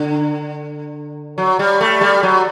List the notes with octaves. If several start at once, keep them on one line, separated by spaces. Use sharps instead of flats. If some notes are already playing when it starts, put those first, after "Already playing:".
Already playing: D3
F#3
G3
A3
G3
F#3